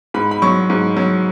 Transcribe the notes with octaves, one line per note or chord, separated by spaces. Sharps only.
G#2 B5
B5
F#3 C#6
G#2
F#3